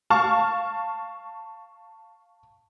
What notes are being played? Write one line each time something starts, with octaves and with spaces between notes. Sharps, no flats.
F5 A5 C#6 F6